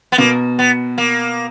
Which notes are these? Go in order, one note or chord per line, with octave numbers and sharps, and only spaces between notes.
B3
B2 A#3
B3
A#3